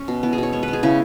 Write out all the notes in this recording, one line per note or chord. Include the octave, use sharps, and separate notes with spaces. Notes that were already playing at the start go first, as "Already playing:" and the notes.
Already playing: C#4
B2
B3 E4
G#4
B2 C#5
G#3 C#5
B4
B3
G#4
C#3 E4